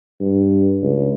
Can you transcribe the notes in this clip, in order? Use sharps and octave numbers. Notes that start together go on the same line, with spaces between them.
G2
C#2